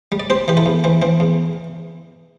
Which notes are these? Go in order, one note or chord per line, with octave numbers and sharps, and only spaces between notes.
G3
D5
C4 G4 C5
E3 G4
E4 A4
E2
E3 C4
E3 C4
E2